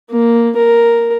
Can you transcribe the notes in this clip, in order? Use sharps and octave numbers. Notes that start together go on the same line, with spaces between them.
A#3
A#4